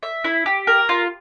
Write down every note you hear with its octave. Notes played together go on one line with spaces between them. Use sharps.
E5
E4
G4
A#4
F4